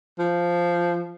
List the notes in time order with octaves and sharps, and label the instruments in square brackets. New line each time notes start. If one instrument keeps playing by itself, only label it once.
[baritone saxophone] F3